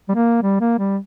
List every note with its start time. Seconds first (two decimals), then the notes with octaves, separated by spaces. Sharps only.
0.09 G3
0.15 A#3
0.43 G3
0.61 A#3
0.79 G3